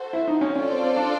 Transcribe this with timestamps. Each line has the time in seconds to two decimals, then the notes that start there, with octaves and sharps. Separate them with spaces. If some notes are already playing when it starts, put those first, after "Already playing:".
Already playing: F#4 A4 C5
0.13 E4
0.28 D#4
0.41 C#4
0.55 C#4 F4 A4 D5
0.69 C4
0.82 C4
0.96 D4